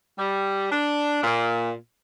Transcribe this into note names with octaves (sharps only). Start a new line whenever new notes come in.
G3
D4
A#2